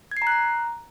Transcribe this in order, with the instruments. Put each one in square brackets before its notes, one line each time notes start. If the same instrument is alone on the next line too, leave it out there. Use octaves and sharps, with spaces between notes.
[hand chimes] G#6
C7
A#5
F#6
A#5